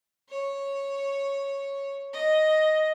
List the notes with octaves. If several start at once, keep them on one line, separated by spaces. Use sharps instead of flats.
C#5
D#5